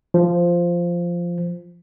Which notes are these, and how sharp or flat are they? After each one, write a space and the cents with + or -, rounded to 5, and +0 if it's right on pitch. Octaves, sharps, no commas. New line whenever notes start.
F3 -5